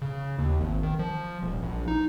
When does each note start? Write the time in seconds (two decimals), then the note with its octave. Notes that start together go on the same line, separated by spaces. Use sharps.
0.02 C#3
0.38 D#2
0.60 G#1
0.83 D#3
0.99 F3
1.42 D#1
1.62 A#1
1.88 D#4